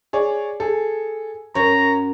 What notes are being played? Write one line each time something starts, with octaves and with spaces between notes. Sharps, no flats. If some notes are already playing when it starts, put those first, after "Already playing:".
G#4 C#5 D5
G#4 A4
F#2 C#5 A#5